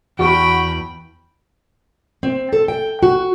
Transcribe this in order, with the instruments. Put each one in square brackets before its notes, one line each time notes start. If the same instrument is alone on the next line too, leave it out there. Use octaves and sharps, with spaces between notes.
[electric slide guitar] E2 [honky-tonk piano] F#4 C#6 [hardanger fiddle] G5 B5
[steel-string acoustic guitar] C4
A4
G5
F#4